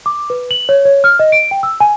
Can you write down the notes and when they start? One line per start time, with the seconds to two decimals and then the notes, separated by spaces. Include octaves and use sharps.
0.06 D6
0.30 B4
0.51 F#7
0.69 C#5
0.85 C#5
1.04 F6
1.19 D#5
1.32 D7
1.51 G5
1.63 E6
1.80 G#5